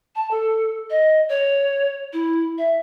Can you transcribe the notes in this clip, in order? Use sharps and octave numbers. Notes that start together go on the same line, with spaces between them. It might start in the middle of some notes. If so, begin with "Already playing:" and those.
A5
A4
D#5
C#5
E4
E5